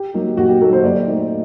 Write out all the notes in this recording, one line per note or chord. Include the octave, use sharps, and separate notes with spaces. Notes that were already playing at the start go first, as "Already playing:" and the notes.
Already playing: G4
F#3 A#3 D#4
A#2 F#4
G4
F#3 A#3 D#4 A4
C5
A#2 D5
A3 D#4